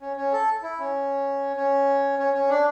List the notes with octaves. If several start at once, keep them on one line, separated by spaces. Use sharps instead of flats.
C#4
C#4
A4
E4
C#4
C#4
C#4
C#4
D4